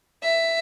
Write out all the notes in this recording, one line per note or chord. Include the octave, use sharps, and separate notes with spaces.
E5